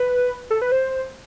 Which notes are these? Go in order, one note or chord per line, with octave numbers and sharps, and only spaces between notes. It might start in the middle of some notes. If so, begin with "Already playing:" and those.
Already playing: B4
A4
B4
C5